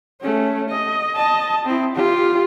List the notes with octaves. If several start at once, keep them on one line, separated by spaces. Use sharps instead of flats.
A3 C#4
D#5
D#5 A5
C4 E4
F4 G4